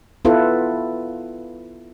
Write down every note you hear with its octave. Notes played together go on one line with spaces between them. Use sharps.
B3 E4 F4 A4 B4